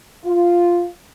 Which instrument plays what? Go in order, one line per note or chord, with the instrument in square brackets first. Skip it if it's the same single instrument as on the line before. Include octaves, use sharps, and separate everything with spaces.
[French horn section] F4